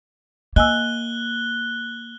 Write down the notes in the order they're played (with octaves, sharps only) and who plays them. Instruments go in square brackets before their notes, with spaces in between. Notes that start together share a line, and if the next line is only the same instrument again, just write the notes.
[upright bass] A#3 [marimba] D#5 G#5 E6 [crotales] F#6 G7